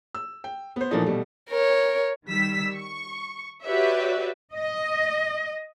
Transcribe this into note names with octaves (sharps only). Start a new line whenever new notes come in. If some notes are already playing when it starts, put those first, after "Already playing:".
E6
G5
B3 C5
A#2 E3 F3 A3 D4 D#4
B2 G3 A3
A#4 C#5
D#3 G3 E6 B6
C#6
F#4 G4 B4 C#5 D5 E5
D#5